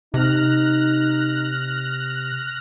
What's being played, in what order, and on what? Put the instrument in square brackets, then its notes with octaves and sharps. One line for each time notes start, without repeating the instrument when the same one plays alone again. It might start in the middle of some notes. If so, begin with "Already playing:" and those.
[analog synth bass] C3 [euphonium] D#4 [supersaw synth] F6 F#6 A#6